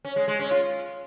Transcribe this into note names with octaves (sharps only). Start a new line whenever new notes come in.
C#4
G#3
G#3
C#4
F4